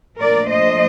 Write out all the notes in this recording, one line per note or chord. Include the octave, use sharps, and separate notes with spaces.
A#2 F3 A3 D4 A#4 D5
C5 D#5